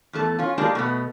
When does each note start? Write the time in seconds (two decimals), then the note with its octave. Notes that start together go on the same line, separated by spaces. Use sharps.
0.13 E2 A3 A4
0.39 C#4 F4
0.58 G#3 A#3 D4 F4 G4 A4
0.75 B2 A3 B3